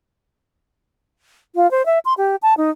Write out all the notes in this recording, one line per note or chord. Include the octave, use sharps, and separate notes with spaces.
F4
C5
E5
C6
G4
A5
D#4